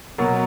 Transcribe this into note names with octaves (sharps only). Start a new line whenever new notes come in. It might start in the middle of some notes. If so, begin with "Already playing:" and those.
B2 F#3 A#3